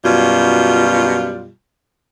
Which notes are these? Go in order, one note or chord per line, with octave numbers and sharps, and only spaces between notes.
F#2 B2 G3 F4